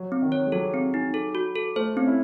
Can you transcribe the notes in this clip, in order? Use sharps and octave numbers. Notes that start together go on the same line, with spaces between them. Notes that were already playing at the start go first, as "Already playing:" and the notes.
Already playing: F#3
C4
D#3
C#5
G#3
F#3 A4
C4
D#4
A4
F#4
A4
A3 C5
C4 C#4
E4